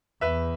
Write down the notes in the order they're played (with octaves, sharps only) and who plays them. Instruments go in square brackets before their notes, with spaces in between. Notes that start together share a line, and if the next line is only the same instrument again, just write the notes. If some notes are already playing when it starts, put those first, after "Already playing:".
[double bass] E2 [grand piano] B4 E5